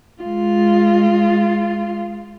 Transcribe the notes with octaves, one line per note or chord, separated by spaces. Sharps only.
G#3 F4